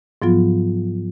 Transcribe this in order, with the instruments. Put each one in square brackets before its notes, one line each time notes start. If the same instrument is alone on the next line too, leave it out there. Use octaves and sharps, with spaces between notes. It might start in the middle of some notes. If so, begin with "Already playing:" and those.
[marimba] G#2 F3 F#3 B3 F4